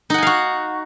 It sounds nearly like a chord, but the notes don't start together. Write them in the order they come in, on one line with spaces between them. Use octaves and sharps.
D#4 F#5 G#5 F5 F#4